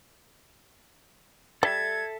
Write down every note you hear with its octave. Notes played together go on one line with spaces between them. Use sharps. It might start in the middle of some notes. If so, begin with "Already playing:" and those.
G3 A4 E5 A5 G#6